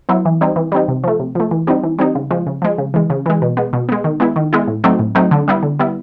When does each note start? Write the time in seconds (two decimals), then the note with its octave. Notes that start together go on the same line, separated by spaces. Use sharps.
0.09 F#3 B3 E4
0.25 E3
0.41 G3 C4 D#4
0.56 E3
0.72 G3 C4 D#4
0.88 C3
1.04 F3 A3
1.20 C3
1.35 F3 A3
1.51 E3
1.67 G3 C4 D#4
1.83 E3
1.99 G3 C4 D#4
2.15 C#3
2.30 F3 G#3
2.47 C#3
2.62 F3 G#3
2.78 C#3
2.94 E3 G#3
3.10 C#3
3.26 E3 G#3
3.42 B2
3.57 G#3 B3
3.73 B2
3.89 G#3 B3
4.04 D#3
4.20 G#3 B3 E4
4.36 D#3
4.53 G#3 B3 E4
4.67 A2
4.84 F#3 A3 C4 D#4
4.99 A2
5.15 F#3 A3 C4 D#4
5.31 D3
5.48 G3 B3 E4
5.63 D3
5.79 G3 B3 E4